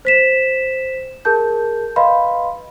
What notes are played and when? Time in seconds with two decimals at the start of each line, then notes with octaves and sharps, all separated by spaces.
0.05 C5 B6 E7
1.25 G#4 A#4 A5 G6
1.96 B4 D#5 F5 B5 C6